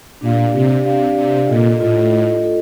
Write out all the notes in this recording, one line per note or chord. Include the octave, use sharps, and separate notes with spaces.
A#2 D4 G4 D5 F5
C3 D4 G4 D5 F5
C3 D4 G4 D5 F5
C3 D4 G4 D5 F5
A#2 F4 A4 D#5
A2 F4 A4 D#5
F4 A4 D#5
F4 A4 D#5